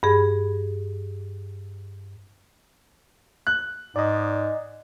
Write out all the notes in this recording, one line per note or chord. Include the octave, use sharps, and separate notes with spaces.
G2 G#4
F#6
G#2 D5 D#5